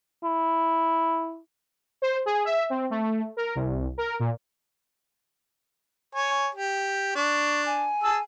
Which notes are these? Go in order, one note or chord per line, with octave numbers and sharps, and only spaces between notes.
E4
C5
G#4
E5
C4
A3
A#4
C2
A#4
A#2
C#5 G#5
G4
D4 C#6
G#5
G#4 A5 E6